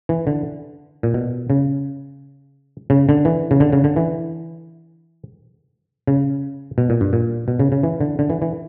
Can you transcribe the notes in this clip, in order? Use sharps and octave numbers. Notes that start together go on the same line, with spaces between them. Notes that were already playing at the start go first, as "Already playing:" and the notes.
E3
D3
A#2
B2
C#3
C#3
D3
E3
C#3
D3
C#3
D3
E3
C#3
B2
A#2
G2
A#2
B2
C#3
C#3
E3
D3
D3
E3
E3